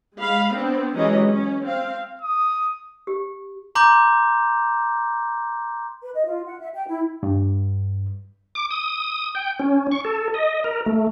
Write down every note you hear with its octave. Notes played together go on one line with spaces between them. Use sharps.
G#3 F5 B5
B3 C4 D4
E3 F#3 G#3 C#4 G4 D#5
C#4
C4 F5
D#6
G4
A#5 C6 D6 G6
B4
D#5
F4
F#5
E5
G5
E4
G2
D6
D#6
G5
C#4
C#6
A4
D#5
A#4
A3